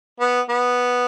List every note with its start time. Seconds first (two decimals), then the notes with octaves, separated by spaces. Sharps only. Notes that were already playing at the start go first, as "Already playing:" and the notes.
0.20 B3
0.49 B3